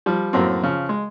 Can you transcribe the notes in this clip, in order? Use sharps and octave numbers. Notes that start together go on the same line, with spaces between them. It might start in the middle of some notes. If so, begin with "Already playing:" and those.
F3 G3
F#2 A2 A#3 C4
C#3 F3
G#3